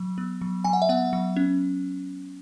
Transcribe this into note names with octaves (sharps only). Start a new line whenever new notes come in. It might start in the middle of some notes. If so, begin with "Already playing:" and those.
Already playing: F#3
B3
F#3
F#3 G#5
F#5
E5
B3 F#5
F#3
C#4